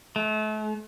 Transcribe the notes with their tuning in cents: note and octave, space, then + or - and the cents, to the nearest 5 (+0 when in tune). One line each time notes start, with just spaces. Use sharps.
A3 -40